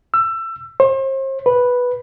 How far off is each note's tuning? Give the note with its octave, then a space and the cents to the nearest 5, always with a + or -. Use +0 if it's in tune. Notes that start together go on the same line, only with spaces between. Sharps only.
E6 +25
C5 +40
B4 -5